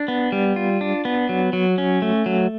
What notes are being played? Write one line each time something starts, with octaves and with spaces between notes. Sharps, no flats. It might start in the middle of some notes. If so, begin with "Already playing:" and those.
Already playing: D4
B3
G3
F4
D4
B3
F#3
F#3
C#4
A3
F#3